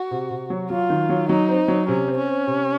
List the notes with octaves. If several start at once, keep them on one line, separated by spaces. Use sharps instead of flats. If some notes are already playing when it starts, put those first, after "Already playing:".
Already playing: F#4
C3
C3
F#3
F#3 F4
D#3
F#3
F#3 D#4
C4
F#3
C3 C#4
C4
C#4
C4
C3